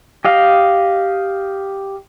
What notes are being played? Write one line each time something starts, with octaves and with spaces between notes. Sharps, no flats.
G4 D#5 F5